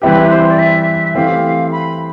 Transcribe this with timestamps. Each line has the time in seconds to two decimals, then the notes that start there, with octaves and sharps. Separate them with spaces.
0.02 E3 G3 C4 E4 G4 B4
0.30 C5
0.49 D5
0.59 E5
1.15 E3 A3 C4 G4 F5
1.71 B5